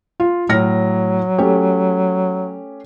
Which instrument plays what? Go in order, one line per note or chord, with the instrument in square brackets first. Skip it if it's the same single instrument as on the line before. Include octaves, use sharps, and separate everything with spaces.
[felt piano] F4
[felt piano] A2 F6 A#6 [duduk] F#3
[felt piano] A3 C#4 G4